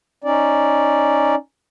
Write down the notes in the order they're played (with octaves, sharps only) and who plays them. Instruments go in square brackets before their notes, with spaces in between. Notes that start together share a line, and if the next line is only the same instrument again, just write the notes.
[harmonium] C#4 D#4 D5